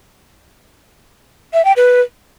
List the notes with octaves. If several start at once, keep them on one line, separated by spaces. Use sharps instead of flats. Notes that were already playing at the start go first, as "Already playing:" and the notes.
E5
G5
B4